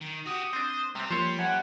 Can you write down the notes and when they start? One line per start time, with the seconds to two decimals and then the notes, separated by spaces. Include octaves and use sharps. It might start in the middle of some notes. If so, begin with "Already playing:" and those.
0.01 D#3
0.27 F#4 G4 D#6
0.53 C4 D4 C5
0.95 C3 G3 C4
1.10 F3 A#3 C5 C#5 C6
1.39 F#2 F#5 G#6